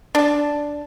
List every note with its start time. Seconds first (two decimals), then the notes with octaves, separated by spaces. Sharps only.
0.15 D4 A5